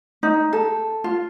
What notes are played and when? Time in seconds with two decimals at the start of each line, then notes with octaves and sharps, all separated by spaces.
0.23 D#4
0.53 A4
1.04 F4